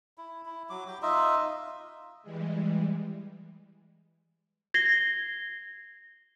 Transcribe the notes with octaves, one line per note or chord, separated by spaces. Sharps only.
E4
E4
F#3 D6
G4 G5 D6
D#4 F4 D#5 E5
E3 G3 G#3
G#6 A#6 C7 G7